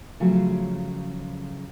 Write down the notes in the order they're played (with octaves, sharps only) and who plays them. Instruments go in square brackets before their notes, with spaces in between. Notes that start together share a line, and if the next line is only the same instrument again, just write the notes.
[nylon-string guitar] C#3 F3 F#3 A3